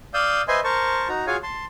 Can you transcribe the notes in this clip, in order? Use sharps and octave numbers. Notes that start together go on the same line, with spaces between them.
D5 F5 D#6 E6 G6
B4 C5 D#5 E5 G#5 C6
A#4 C5 A5 C#6
D#4 F#4 A#5
F4 F#4 G#4 C#5 F5 G#5
A5 C6